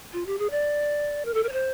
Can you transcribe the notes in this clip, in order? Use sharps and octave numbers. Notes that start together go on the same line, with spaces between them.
F4
G4
G#4
D5
A#4
A4
A#4
C#5
C5